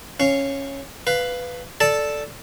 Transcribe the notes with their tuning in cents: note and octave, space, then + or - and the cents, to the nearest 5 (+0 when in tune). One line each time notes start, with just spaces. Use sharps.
C#4 -10 F5 -10
B4 +5 F5 +0
A4 +0 D5 +0 A5 +0